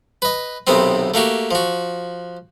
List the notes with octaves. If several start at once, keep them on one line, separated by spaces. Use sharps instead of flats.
B4 D#5
B1 C3 D#3 B3 C4
A3 A#3 F#4 G4
F3 F#4